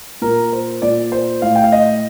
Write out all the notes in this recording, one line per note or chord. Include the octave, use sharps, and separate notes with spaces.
A#2 A#4
C5
A#2 D5
C5
A2 F5
G5
F5
D#5